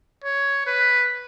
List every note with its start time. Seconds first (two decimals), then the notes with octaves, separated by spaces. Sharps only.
0.24 C#5
0.67 B4